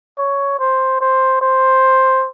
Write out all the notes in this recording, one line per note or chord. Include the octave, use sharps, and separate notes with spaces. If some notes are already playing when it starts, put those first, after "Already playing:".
C#5
C5
C5
C5